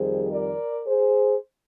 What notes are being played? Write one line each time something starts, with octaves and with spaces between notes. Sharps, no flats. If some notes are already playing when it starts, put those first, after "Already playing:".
Already playing: F2 D#3 G3 G#4 C5
A#4 D5
G#4 C5